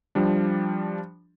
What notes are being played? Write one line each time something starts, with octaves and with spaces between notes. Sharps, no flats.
F3 G3 D4